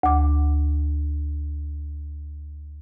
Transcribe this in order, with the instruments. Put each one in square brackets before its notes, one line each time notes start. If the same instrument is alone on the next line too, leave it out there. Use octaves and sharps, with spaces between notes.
[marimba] D2 D6